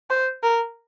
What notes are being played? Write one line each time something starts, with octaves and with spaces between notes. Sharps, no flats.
C5
A#4